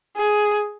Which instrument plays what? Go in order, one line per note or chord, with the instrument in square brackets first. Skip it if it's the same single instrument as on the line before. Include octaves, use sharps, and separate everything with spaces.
[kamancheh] G#4